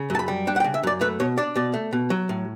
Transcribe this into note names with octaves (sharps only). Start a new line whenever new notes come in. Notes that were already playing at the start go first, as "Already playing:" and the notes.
Already playing: C#3
F#2 A5
B5
G3
D4 G5
F#5
G5
C#3
E5
F#2 D5
A3 B4
B2 C#5
D4 D5
B2 D5
A3
B2
F#3
A2